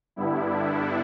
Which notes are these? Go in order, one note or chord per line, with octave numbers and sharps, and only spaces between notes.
G2 D3 G3 B3 E4
D4